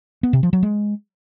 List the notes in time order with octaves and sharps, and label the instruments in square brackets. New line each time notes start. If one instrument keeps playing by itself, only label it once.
[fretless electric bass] B3
C3
F3
F#3
G#3